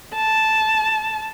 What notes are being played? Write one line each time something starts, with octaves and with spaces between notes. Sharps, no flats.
A5